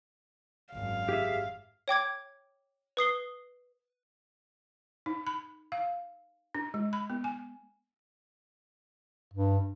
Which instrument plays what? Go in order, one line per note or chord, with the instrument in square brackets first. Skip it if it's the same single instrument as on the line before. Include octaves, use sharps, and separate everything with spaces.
[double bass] G#1 F#2 [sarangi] F5
[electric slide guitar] G4 G#4 E5
[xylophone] C#5 G5 D6 G#6
B4 D#6 C7 G7
[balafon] D#4
B5
F5
D4
G#3
B5
B3
G#5
[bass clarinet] G2